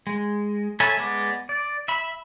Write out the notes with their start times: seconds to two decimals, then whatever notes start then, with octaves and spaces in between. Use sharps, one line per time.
0.07 G#3
0.80 A4 C#5 E5 G#5 B5
0.97 G#3 B3 D5
1.49 D5
1.88 E5 B5